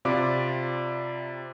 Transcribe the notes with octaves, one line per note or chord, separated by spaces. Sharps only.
C3 F4 D5 B5 D6